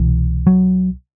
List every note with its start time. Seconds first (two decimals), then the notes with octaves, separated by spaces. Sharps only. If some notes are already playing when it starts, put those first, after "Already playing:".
Already playing: C2 B2 E3
0.47 F#3